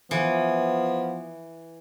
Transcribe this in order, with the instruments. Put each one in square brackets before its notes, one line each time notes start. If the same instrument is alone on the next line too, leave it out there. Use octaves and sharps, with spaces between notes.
[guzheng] E3 [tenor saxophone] F3 [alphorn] B3